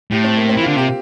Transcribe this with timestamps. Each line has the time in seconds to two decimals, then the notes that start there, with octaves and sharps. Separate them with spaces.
0.11 A2 G4
0.24 C4
0.37 A#3
0.49 C4
0.57 E3 F4
0.67 D3
0.76 C3 G4